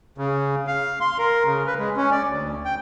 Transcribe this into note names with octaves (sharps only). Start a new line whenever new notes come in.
C#3
F5
C6
A#4
C#3
B4
G#3
C#4
D5
D2
G5